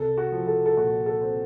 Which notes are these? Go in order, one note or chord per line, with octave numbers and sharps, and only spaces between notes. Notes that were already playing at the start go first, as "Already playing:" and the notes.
Already playing: C2 A4
F#4
F3
A4
A4
A#2 F#4
A4
C4